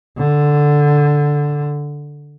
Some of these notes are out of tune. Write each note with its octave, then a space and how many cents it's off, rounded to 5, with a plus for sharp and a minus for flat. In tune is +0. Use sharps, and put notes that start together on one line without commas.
D3 +0